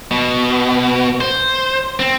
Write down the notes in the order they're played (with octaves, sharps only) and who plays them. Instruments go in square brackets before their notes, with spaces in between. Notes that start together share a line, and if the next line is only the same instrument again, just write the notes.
[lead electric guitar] B2
C5
C4